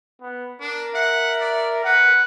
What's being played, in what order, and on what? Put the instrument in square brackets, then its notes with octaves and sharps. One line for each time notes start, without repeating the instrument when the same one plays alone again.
[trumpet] B3
[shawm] D4 [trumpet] A#4
[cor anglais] E5 [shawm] F#5
[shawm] D5
[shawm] B4 [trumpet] F#5